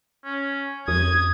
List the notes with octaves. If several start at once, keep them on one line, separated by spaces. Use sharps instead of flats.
C#4
F2 D#6 G#6